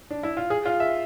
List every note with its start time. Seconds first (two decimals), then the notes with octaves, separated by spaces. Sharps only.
0.10 D4
0.23 E4
0.37 F4
0.50 G#4
0.65 F4
0.80 E5